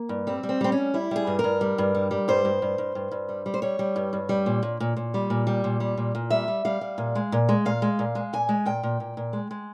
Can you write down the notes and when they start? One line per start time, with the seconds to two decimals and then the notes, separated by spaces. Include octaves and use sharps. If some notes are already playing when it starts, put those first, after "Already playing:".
Already playing: A#3
0.09 G2
0.27 G3 C4
0.43 G3
0.49 C4
0.61 G3 C4
0.72 C#4
0.78 G3
0.94 G3 E4
1.11 G3 G#4
1.27 G2
1.39 A#4
1.44 G2
1.61 G3
1.78 G2
1.95 G3
2.11 G3
2.28 G2 C5
2.45 G2
2.62 G2
2.78 G2
2.95 G2
3.11 G2
3.29 G3
3.46 G3
3.54 C5
3.62 G3 C#5
3.79 G3
3.96 G2
4.13 G2
4.29 G3
4.46 A#2
4.63 A#2
4.80 A#2
4.97 A#2
5.14 G3
5.30 A#2
5.47 G3
5.64 A#2
5.80 G3
5.97 A#2
6.15 A#2
6.30 G3 E5
6.48 G3
6.65 G3 F5
6.81 G3
6.98 A#2
7.15 G#3
7.32 A#2
7.49 G#3
7.65 A#2 F5
7.82 G#3
7.99 A#2
8.15 G#3
8.33 A#2 G#5
8.49 G#3
8.65 A#2 G5
8.83 A#2
9.00 A#2
9.17 A#2
9.33 G#3
9.51 G#3